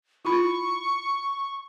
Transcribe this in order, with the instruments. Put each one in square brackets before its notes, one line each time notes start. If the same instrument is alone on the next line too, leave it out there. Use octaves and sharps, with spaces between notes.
[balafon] E4 F4 B5 [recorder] C#6